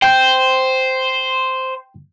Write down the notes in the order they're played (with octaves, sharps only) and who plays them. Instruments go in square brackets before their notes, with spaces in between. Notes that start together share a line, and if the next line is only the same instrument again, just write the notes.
[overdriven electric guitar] C5 [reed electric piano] G5 G6